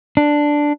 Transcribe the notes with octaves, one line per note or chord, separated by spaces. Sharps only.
D4